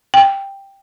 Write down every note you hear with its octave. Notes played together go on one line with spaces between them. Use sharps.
G5